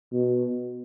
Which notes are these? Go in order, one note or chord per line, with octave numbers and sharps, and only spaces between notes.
B2